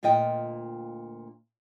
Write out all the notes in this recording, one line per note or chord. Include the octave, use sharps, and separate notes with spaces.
D2 A#2 F4 D#5 G5